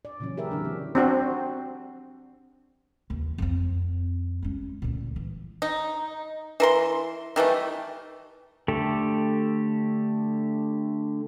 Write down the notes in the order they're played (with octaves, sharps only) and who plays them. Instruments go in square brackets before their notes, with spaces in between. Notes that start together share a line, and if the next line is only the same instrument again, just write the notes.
[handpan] D5
A#2 C#3 E3 F#3 C#4
G4 G#4 A#4 B4 E5
D3 E3 F#3 C4 D4
A#3
[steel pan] C4 D4 F#4 C5
[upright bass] D#2 E3
F2 C4
G#3 C#4
D2 A#2
E3
[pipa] D#4
E3 A#4 C6
D#3 E3 G3 A3
[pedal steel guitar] D3 A3 G4 A4